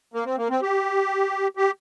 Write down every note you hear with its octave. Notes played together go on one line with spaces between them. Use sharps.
A#3
C4
A#3
C4
G4
G4